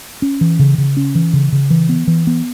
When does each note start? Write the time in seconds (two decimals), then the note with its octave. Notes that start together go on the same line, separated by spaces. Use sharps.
0.22 C#4
0.41 E3
0.59 C#3
0.78 C#3
0.97 C#4
1.15 E3
1.33 C#3
1.52 C#3
1.70 E3
1.89 B3
2.07 E3
2.27 B3